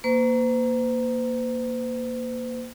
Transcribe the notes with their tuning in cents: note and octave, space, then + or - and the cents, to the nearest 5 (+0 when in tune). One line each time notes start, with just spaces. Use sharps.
A#3 +5 C5 -45